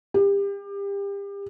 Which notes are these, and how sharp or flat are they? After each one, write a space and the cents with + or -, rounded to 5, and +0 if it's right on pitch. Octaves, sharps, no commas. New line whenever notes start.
G4 +30